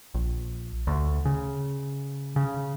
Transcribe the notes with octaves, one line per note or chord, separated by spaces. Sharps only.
A#1
D2
C#3
C#3